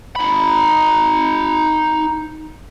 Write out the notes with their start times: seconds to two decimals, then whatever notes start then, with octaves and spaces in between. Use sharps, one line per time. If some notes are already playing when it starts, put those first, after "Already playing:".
0.16 D#4 B5